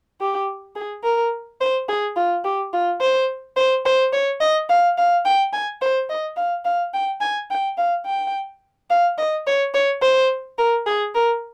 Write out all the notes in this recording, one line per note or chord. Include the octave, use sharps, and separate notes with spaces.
G4
G#4
A#4
C5
G#4
F4
G4
F4
C5
C5
C5
C#5
D#5
F5
F5
G5
G#5
C5
D#5
F5
F5
G5
G#5
G5
F5
G5
F5
D#5
C#5
C#5
C5
A#4
G#4
A#4